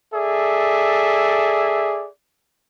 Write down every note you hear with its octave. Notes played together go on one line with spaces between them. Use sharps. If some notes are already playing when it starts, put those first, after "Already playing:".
G#4 A4 D5 E5